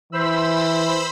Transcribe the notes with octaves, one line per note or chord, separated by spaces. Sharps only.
E3 C5 B5 E6